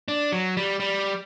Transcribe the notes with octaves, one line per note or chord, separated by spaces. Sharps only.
D4
F#3
G3
G3